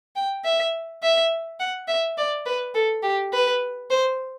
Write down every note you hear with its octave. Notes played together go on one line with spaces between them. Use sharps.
G5
E5
E5
F#5
E5
D5
B4
A4
G4
B4
C5